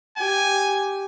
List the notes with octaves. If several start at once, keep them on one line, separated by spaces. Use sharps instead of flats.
G4 G#5